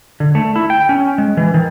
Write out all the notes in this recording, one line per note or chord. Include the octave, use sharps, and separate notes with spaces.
D3
A3
E4
G5
C#4
G#3
E3
D#3